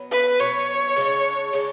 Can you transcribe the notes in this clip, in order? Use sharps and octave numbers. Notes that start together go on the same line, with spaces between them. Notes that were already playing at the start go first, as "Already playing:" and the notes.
Already playing: B2 F#3 B3
B4
B2 F#3 B3 C#5
C#3 G#3 D4
C#3 G#3 D4